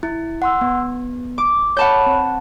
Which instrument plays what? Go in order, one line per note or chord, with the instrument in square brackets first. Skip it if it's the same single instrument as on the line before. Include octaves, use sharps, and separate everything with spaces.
[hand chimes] E4
F#5 C6 E6
B3
[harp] D6
[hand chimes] C#5 B5 [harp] F#5 A5 G6
[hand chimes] C4